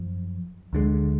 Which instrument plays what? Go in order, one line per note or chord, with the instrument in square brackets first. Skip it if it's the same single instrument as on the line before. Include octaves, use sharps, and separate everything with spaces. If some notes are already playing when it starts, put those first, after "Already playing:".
Already playing: [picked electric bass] F#2 F3
D2 D3 G#3